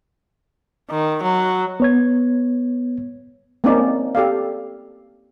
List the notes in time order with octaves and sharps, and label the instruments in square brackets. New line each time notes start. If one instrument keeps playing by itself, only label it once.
[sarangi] D#3
F#3
[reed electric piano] B3 C#5 G#6
[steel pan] A#3 C4 C#4 D#4 A#4 D5
G4 A4 D5 F5